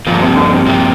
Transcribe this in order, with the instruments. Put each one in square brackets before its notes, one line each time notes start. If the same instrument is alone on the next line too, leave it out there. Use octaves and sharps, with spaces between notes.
[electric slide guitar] G2 F3 A#3 [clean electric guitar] A#2
[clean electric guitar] C3
D3
C3
[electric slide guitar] G2 F3 A#3 [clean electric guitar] C3